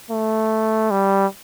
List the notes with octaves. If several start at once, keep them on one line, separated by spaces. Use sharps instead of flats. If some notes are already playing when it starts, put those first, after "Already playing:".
A3
G3